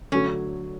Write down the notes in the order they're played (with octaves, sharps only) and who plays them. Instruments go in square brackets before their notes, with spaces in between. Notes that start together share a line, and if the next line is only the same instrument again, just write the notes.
[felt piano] D3 F#3 A3 [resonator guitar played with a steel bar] C#4